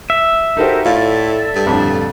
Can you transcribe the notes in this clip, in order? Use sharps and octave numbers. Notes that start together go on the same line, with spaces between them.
E5
D#4 F#4 G4 A4 A#4 C5
A2 F4 A4 D5
G2
F2 A2 D3